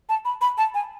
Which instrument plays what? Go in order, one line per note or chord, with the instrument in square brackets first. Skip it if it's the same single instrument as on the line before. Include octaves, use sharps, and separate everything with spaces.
[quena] A5
B5
B5
A5
G#5